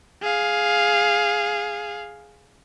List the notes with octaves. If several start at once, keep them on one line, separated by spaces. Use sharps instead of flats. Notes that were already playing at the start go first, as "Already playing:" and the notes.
G#4 F5